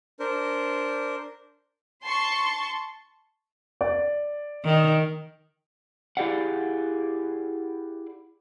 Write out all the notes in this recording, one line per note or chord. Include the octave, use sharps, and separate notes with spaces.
D4 A#4 C5
A5 C6 C#6
D5
D#3
E4 G4 G#4 D5 F5 F#5